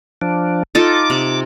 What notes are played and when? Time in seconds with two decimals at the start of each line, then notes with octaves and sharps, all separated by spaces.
0.21 F3 D4
0.75 D#4 F4 A4 D6
1.10 C3